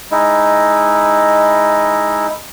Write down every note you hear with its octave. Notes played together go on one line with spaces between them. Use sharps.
G#3 D#4 E4